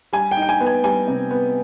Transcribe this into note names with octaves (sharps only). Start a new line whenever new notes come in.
G3 G#5
G5
D#4
G5
G#5
B3
G#5
G3 G#5
C3
B3